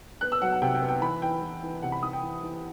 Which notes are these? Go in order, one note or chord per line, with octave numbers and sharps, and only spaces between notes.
B3 F#6
E6
F#3 F#5
F#5
C3 G5
G5
B3
G5
E3 B5
E3 G5
E3
E3
C3 F#5
B5
E3 D#6
G5
E3
E3